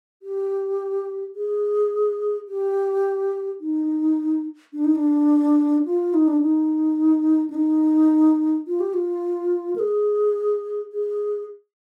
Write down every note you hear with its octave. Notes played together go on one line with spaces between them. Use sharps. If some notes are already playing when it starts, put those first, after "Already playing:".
G4
G#4
G4
D#4
D4
D#4
D4
F4
D#4
D4
D#4
D4
D#4
F4
G4
F4
A#4
G#4
G#4